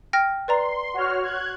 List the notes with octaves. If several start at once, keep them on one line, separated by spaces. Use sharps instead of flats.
G5 F6 A#6
B4 D5 A#5 C6
F#4 C#5 F6
F#6 G#6